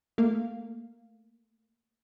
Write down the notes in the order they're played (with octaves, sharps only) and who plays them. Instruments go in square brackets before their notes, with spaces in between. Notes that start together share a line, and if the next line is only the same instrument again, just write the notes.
[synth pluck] A3 A#3 F5